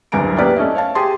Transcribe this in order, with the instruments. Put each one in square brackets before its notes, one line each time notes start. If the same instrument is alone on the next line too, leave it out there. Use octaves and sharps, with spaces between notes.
[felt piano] F#1 D2 G2 G#5 A#5 D7
A#3 B3 C#4 G4 B4 D5
A3 C#4 D#5 E5
C#5 F5 A5
G4 G#4 A5 C6